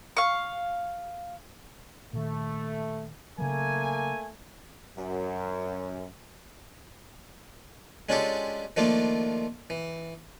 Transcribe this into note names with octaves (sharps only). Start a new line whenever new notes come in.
F5 C#6
A#2 D#3 A3
C#3 F#3 A3 A#3 G#5
F#2
G#3 C#4 D4 F4 G4 A4
D#3 F3 A3 A#3 D4 F4
E3